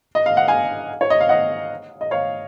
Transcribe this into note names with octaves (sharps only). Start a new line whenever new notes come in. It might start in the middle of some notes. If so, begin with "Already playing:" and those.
D#5
F5
F#5
F5 G#5
C#5
D#5
F5
D#5 F#5
D#5
C#5 F5